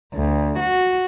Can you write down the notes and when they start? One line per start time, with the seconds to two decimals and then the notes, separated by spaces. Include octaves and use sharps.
0.14 D2
0.60 F#4